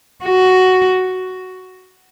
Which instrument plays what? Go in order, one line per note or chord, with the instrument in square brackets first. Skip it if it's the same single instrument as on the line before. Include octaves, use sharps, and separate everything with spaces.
[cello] F#4